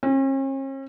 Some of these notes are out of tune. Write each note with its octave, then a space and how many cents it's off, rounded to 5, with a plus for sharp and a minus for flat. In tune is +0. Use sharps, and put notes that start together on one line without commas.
C#4 -45